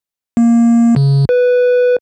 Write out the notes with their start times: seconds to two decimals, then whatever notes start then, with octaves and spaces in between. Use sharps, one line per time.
0.37 A#3
0.96 C#3
1.29 B4